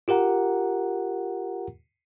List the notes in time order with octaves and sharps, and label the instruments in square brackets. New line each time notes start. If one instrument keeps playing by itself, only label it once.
[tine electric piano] F4 G4 A#4 F#5 A#5